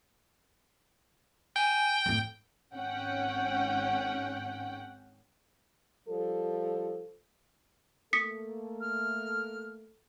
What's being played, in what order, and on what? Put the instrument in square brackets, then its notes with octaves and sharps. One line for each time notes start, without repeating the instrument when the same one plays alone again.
[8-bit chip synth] G5 [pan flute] G#5
[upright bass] F2 A2
[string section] G#1 G#2 C#4 F#5 G5
[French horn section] F3 G3 A4
[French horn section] A3 A#3 A4 [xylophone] D#6 B6 C#7
[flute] F6